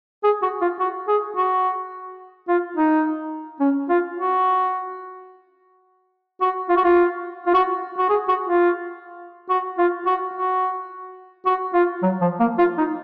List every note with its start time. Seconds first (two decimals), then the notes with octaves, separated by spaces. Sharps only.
0.24 G#4
0.42 F#4
0.61 F4
0.80 F#4
1.08 G#4
1.36 F#4
2.48 F4
2.77 D#4
3.60 C#4
3.89 F4
4.17 F#4
6.41 F#4
6.69 F4
6.77 F#4
6.84 F4
7.46 F4
7.54 F#4
7.98 F#4
8.09 G#4
8.28 F#4
8.46 F4
9.50 F#4
9.78 F4
10.06 F#4
10.34 F#4
11.46 F#4
11.74 F4
12.03 F#3
12.21 F3
12.40 A#3
12.58 F4
12.78 D#4